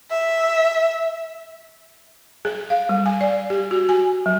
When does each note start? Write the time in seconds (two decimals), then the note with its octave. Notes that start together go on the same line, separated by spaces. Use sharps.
0.11 E5
2.45 G#4
2.70 F5
2.89 G3
3.06 G#5
3.21 D5
3.50 G4
3.71 F#4
3.89 G#5
4.26 F#3